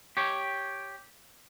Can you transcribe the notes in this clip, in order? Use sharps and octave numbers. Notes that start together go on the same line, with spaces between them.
G4 C#5